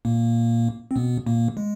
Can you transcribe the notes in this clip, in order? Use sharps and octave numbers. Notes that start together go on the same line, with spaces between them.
A#2 A#3
C4
B2 B3
A#2 A#3
G#3